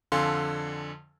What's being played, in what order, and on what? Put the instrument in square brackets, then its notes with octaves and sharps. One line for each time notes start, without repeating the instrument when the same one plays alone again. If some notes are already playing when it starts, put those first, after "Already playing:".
[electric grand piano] F2 D3 A4 F5 G#5 C6